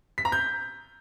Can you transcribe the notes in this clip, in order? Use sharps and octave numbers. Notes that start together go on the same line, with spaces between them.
B6
A#5
G6